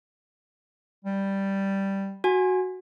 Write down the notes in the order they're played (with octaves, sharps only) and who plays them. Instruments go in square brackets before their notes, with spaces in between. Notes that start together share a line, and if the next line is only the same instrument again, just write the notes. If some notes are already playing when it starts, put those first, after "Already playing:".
[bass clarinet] G3
[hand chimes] F#4 G#5